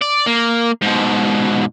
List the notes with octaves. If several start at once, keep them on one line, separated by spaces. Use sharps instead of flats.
D5
A#3
G#2 B2